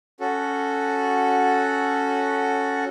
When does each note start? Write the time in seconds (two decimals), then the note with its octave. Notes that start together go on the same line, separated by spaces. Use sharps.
0.20 C#4 F#4 A4